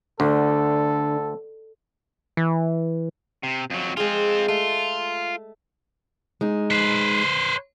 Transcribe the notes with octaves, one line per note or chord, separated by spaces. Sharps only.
D2 D3 A4
E3
C3
F2 F#3
G#3 C4 F4 G#4
A3 F4
G#3 D#4
B4 C5